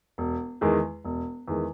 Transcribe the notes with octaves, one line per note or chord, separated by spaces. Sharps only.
E1
E2 D#3 G#3
E1
E2 D#3 G#3